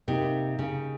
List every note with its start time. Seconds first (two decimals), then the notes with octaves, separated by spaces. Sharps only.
0.08 C3 A#3 D#4 G4
0.59 C#3